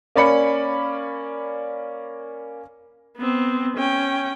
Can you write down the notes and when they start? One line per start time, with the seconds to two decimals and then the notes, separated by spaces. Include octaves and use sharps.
0.16 A#3 C#4 D5 B5 C#7
3.18 B3 C4
3.77 C#4 G5